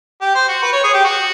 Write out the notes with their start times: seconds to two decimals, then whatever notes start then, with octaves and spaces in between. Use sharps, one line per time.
0.21 G4
0.35 C5
0.48 F#4
0.63 B4
0.72 C#5
0.84 G#4
0.93 G4
1.05 F#4